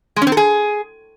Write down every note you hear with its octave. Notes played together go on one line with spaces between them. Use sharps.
G#3
C#4
C4
A4
G#4